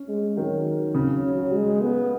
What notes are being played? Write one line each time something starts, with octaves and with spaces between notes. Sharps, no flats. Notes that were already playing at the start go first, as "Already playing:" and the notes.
Already playing: C#4
G#3
D#3 F#3
C#3
G#3
B3